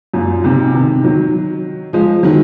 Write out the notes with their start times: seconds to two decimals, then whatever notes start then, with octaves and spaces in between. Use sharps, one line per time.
0.14 F#2 A#2
0.44 G#2 C3
0.75 C3 D#3
1.03 D#3 F#3
1.93 F3 G#3
2.23 D#3 F#3